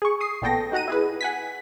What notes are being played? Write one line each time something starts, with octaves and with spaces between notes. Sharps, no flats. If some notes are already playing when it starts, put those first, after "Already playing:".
G#4 C#6
D#6 C7
A1 A#2 B3 A4 G5 A#6
D#4 F#4 F#5 A#5 D#7
E4 G#4 B4
F#5 G#5 B6